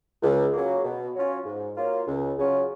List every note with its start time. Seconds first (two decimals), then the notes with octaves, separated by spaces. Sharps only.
0.23 C#2
0.54 C#3 F#3 A#3
0.84 B2
1.15 F#3 C#4 F4
1.46 G#2
1.77 F#3 A#3 F4
2.08 C#2
2.38 C#3 F#3 C#4 F4